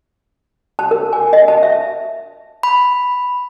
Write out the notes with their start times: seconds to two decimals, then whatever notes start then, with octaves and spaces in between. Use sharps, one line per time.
0.79 A5
0.91 A#4
1.13 G#5
1.33 D#5
1.48 A5
1.63 E5
2.63 B5